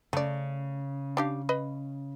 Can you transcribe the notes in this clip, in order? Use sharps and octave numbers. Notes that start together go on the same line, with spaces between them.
C#3 A3 D5
D4 G4 F5
B4 D#5 B5